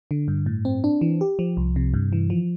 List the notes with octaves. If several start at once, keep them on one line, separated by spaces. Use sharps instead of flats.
D3
G2
A2
C4
D4
E3
G4
F3
C2
C3
G2
E3
F3